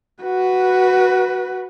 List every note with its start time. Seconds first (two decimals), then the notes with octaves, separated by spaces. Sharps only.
0.23 F#4 B4